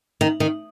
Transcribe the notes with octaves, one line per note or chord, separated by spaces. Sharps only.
D#3
D#3